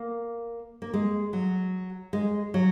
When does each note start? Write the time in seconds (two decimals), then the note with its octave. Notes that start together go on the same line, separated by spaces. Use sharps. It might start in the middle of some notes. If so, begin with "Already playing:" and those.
Already playing: A#3
0.82 A#3
0.94 G#3
1.33 F#3
2.13 G#3
2.54 F#3